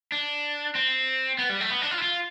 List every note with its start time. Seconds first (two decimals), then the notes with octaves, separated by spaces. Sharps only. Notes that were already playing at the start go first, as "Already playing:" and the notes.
0.12 D4
0.75 C4
1.38 B3
1.50 G3
1.61 A3
1.70 B3
1.82 D4
1.91 F4
1.98 E4
2.02 F4